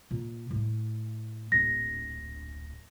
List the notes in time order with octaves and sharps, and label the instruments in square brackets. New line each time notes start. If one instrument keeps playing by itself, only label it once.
[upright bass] A#2
A2 A3
[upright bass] D1 A#1 [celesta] A#6